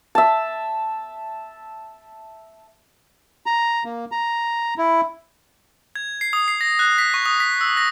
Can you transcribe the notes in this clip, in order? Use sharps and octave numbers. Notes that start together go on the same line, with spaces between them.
E5 A5
A#5
A#3
A#5
E4
G#6
C7
D#6
C7
A#6
F#6
B6
C#6
D#6
B6
E6
A#6